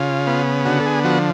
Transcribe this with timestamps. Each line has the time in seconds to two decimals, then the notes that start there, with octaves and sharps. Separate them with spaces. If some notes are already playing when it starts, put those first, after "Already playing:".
Already playing: C#3 F4
0.27 B3
0.65 D3 F#4
0.80 A4
0.86 G#4
1.04 F3 F#4